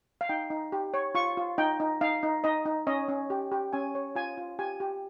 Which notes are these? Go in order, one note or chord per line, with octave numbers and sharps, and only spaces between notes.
F5
D#4 G5
D#4
G4
C#5
F4 C#6
F4
D#4 G5
D#4
D#4 F5
D#4
D#4 D#5
D#4
C#4 D#5
C#4
G4
G4
C#4 G#5
C#5
F4 G#5
F4
G4 G#5
G4